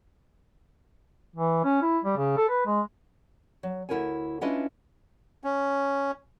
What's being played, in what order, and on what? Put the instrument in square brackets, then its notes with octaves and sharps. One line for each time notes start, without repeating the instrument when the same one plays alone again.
[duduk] E3
C#4
E4
G3
C#3
A4
B4
G#3
[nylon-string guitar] F#3
D2 F3 E4 A#4 C#5 G#5
C#4 D4 E4 F4 B4 D#5
[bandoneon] C#4